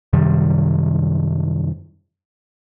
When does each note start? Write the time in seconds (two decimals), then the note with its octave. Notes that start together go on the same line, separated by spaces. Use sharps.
0.13 F#2 C3 D#3 G3